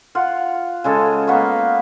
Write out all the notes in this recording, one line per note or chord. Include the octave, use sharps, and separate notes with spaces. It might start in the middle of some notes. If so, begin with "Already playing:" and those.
F4 F#5
C#3 G#3 A4
A#3 B3 F5 C#6